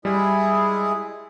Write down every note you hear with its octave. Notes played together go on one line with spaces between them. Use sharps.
G3 G#3 E4 G#4